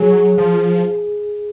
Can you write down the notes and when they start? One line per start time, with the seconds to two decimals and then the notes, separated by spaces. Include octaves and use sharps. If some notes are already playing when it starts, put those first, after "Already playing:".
Already playing: F#3 G#4
0.38 F3